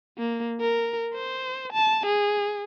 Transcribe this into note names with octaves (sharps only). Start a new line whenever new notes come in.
A#3
A#4
C5
A5
G#4